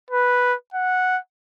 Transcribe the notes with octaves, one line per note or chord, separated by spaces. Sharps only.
B4
F#5